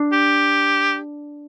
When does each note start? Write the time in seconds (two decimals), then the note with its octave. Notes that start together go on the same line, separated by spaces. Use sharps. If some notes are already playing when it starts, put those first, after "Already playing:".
Already playing: D4
0.12 G4